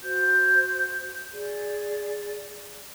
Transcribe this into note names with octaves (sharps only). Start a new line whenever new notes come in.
F#4 C5 G6
G#4 D5